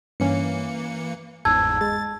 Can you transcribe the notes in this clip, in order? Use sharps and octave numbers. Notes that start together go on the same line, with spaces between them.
G2 E3 A#3 C#4 C#7
G1 E2 G#2 A5 E6 G#6
G#3 A6